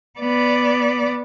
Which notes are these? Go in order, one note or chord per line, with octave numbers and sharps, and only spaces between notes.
B3 D5